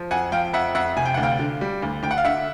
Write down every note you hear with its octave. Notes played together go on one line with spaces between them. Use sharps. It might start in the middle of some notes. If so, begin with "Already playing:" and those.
Already playing: F3
F2 F#5 G#5
F3 F5 G5
F2 E5 F#5
F2 E5 F#5
C3 G#5
G5
D2 F#5
F5 G5
D3
G3
D2
D2 G5
F#5
F5
D3 E5 F#5